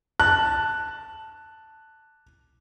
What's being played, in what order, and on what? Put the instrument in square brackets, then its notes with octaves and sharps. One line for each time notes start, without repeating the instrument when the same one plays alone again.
[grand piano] A5 F#6